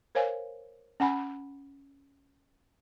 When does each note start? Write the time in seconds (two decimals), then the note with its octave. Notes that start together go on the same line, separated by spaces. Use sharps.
0.15 A#4 C5 C#5 F5 G#5
1.00 C#4 F#5 G#5 B5